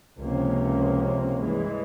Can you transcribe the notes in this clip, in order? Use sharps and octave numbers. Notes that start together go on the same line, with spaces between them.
C#2 C3 F3 A#3 C#4
G2 E3 G#3